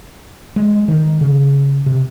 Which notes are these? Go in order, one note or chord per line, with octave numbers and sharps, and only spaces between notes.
G#3
D#3
C#3
C3